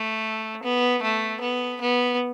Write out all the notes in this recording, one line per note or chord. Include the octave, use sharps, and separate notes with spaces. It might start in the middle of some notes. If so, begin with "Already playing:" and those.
Already playing: A3
B3
A3
B3
B3